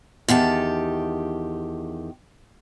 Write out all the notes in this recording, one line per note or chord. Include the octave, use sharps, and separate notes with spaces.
E2 D#3 G4 A5